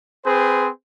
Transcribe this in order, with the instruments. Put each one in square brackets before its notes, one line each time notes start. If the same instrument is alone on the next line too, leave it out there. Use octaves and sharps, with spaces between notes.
[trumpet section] C4 G#4 B4 C5